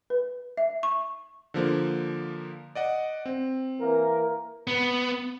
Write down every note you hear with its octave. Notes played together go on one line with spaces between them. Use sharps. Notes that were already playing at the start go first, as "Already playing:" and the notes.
B4
E5
C#6
D3 F3 A#3
D5 D#5 F#5
C4
E3 A#3 A#4
B3